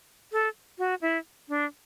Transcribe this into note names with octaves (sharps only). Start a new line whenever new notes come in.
A4
F#4
E4
D4